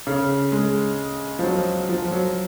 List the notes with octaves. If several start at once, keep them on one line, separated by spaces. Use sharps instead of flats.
C#3
G#3
F3
F#3
F3
F#3